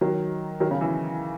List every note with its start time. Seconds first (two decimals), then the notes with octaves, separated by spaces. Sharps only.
0.01 D#3 F#3
0.60 D#3 F#3
0.71 C#3
0.81 E3